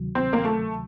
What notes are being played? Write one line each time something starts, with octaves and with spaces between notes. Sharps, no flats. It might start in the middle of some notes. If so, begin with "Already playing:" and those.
Already playing: D2 C3 D#3 F#3
C4
A#3
A3